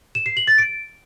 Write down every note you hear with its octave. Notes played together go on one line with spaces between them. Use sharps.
E7
C7
F#7
A6
D7